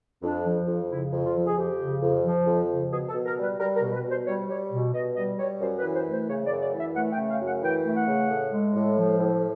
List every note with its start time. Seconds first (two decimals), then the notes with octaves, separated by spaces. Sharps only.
0.23 F2 D4
0.45 F3
0.68 F2
0.90 C#3 E4
1.13 F2
1.24 F4
1.35 F3
1.46 G#4
1.57 F2 G4
1.80 C#3
2.02 F2
2.25 F3
2.46 F2
2.69 C#3
2.92 B2 G#4
3.09 A4
3.14 B2
3.25 A#4
3.36 G3
3.42 B4
3.59 G3 A#4
3.75 A#4
3.81 B2
3.92 B4
4.04 B2
4.09 C5
4.26 G3 C#5
4.49 G3 C#5
4.71 B2
4.93 B2 D#5
5.16 G3 D#5
5.38 G3 C#5
5.61 F#2 C5
5.77 B4
5.83 E3
5.94 C5
6.06 A3
6.11 C5
6.28 C#3 C#5
6.45 D5
6.50 F#2
6.62 D5
6.73 E3
6.79 E5
6.95 A3 F#5
7.12 G5
7.18 C#3
7.29 F5
7.40 F#2
7.46 F#5
7.63 E3 G5
7.85 A3
7.96 F#5
8.07 C#3
8.30 A2
8.53 G#3
8.75 A2
8.98 F3
9.19 A2